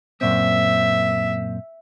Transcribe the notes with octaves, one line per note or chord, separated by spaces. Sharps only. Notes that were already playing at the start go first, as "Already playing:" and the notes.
F#2 A#2 C4 E5